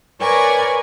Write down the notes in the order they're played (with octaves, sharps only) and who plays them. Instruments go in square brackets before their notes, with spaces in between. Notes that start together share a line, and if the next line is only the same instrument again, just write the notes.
[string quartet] A#4 B4 C#5 D5 G#5 C#6